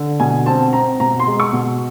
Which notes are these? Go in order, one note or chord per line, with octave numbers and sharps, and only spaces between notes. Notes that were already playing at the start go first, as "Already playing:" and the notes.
Already playing: D3
B2 G#5
C4 A5
C4 A#5
B2 A#5
C6
G#3
C#6
B2